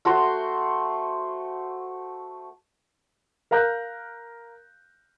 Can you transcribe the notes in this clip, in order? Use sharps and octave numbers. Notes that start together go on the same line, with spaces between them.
A3 F#4 C5 C6
A#4 F5 A#5 F#6 G6